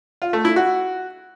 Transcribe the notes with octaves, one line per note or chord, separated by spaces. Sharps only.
F4
A3
E4
F#4